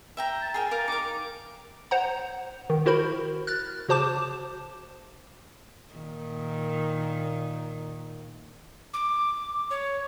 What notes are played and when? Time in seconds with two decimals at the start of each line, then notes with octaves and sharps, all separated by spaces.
0.17 E5 G5 A#5
0.42 A5
0.54 G#4 A#4 G5
0.71 A#4 F5 D6
0.88 D#4 A#4 D6
1.91 C5 F#5 A#5
2.70 D#3
2.86 E4 F#4 A#4 C5 B5
3.47 F6 F#6 A6
3.89 C#3 F#4 C5 A5 D6 E7
5.94 A#2 D#3
8.94 D6
9.71 C#5